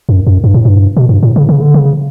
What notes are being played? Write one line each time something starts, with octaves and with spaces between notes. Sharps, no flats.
F#2
F#2
G2
A2
G2
B2
G2
A2
C#3
C#3
D3
C#3